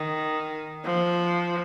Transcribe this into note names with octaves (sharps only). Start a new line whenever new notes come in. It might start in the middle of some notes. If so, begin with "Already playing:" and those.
Already playing: D#3
F3